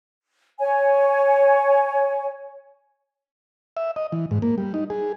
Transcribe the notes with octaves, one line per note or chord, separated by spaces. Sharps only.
C#5 G#5
E5
D#5
E3
G#2
A#3
G3
D#4
G#4